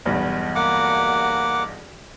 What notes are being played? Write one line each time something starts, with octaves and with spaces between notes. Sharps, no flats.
B1 E2 G2
A#3 F#5 D6